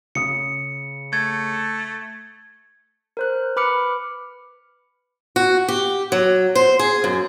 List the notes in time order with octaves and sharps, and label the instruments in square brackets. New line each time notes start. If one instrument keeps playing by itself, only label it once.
[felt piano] C#3 D#6 [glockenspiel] C#7
[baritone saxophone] A3 [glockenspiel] G#6
[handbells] A#4 C5 F#6
B4 B5 D6 F6 C#7
[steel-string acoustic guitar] F#4
G4
F#3
C5
G#4
F#2